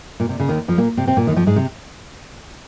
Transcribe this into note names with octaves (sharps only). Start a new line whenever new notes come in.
A#2
C3
C#3
D#2 D#3
F2 F3
A#2 A#3
C3 C4
C3 C4
A#2 A#3
D#2 D#3
F2 F3
G#2 G#3
C3 C4